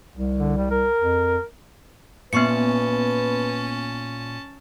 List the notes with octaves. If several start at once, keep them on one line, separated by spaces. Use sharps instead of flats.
C2
D3
G3
A#4
F2
A#2 B3 C#4 B4 A5 C#6 C#7